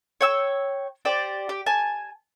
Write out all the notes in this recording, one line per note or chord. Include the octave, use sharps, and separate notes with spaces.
C#5 G5 E6
G4 C5 D5
G4
G#5 A5